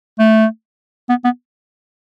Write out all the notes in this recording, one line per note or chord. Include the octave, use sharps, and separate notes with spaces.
A3
B3
B3